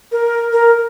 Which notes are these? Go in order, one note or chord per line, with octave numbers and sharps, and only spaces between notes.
A#4
A#4